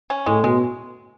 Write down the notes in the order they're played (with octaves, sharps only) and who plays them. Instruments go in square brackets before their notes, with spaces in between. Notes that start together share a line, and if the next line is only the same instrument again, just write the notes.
[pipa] C#4
[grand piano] A2 A3 [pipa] G#3
[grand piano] B2 B3 [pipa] G#3